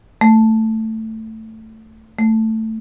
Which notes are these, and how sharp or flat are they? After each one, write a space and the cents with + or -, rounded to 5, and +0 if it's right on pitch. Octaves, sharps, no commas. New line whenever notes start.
A3 +10
A3 +10